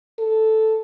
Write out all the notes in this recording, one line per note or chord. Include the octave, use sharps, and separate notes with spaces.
A4